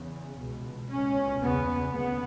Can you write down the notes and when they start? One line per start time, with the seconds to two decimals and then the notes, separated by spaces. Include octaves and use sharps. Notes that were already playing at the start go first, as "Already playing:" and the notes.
Already playing: E2 C#3
0.38 C#2 B2
0.90 C#2 B2 C#4
1.43 E2 C#3 B3
1.95 D2 C#3 B3